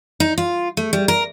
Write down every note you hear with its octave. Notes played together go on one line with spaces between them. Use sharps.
D#4
F4
A3
G3
A#4